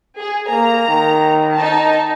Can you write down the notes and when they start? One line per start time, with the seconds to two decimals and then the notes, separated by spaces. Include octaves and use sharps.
0.18 G#4
0.50 A#3 A#5
0.88 D#3
1.55 D#4 A5